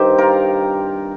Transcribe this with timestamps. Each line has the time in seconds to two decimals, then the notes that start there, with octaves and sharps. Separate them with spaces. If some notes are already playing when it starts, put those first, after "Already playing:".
Already playing: G2 D#3 C4 D#4 G4 C5
0.18 F4 A#4